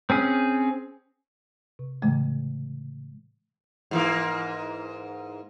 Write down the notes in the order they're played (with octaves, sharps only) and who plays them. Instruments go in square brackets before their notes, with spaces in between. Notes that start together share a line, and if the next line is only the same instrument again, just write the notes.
[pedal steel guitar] C4 C#4 G#4
[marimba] C3
A2 C#3 E3 G#3 A3
[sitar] G#2 E3 A#3